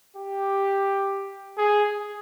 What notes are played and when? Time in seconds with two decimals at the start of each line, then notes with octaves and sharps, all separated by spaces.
0.16 G4
1.58 G#4